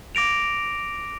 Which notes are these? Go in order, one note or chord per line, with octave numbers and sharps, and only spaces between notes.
D6 A#6 D7 F7